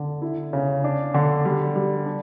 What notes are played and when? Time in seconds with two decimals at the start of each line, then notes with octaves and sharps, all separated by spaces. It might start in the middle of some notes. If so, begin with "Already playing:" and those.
Already playing: D3
0.22 E4
0.53 C#3
0.84 D4
1.14 D3
1.45 G3
1.76 G3
2.06 D4